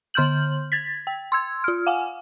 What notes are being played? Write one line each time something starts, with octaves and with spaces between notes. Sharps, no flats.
D3 C6 F6 G6 F#7
G#6 A6 B6
G5
C6 E6 G#6
F4 F6
F5 F#5 G#5